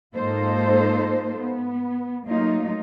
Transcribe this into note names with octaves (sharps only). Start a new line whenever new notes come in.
G#2 A#3 D#4 F4 A4 C5
B3
F#3 A3 A#3 D#4 F4